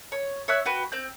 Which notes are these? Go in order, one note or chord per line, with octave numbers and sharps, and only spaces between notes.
C#5
C#5 E5 F#6
F#4 B4 G5
C4 G6